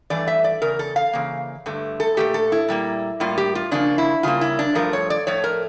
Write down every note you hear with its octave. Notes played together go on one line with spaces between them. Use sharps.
G2 E3 A3 D5
E5
D5
E2 C#3 A#4
A4
F5
C#3 E3 A#3
G2 D3 A3
A4
A#2 F3 A3 G4
A4
E4
A#2 G3 A#3
A2 G3 A#3 F4
G4
F4
C#3 F3 A#3 D4
E4
C#3 G3 A#3 F4
E4
D4
G2 F3 A3 A#4
C#5
D5
A2 F3 A3 C#5
A#4